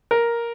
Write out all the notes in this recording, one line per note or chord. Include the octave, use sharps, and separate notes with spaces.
A#4